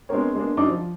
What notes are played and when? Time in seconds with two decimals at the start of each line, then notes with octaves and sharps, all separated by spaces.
0.09 G#3 B3 C4 D4 A#4 C#5
0.35 G#3 A#3 B3 D4
0.57 F#2 D4 D#4 D5 D6
0.69 F3